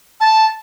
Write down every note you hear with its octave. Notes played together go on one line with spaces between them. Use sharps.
A5